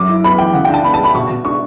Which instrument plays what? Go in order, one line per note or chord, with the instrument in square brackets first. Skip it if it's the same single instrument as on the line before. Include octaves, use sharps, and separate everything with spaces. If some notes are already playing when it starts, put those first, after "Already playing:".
Already playing: [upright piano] F#2 F#3 D6
E4
B3 B5
E3 G5
C#3 F#5
G5
D4 A5
B3 B5
A5
G3 B5
B2 C#6
B2
D4 C#6